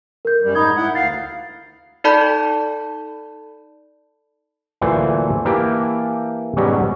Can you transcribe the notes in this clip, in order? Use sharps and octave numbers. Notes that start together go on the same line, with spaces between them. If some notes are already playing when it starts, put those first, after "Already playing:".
A#4 G6
F#2 G3
G#2 D#4 B5 D#6 G6 G#6
E4 F#5
D2 F5 A6 C7
D#4 A4 D5 A5 B5 G6
D2 A#2 E3 F#3 A4 C5
E3 A#3 E4 G4 G5 A5
G#2 B2 F#3 G3 C#4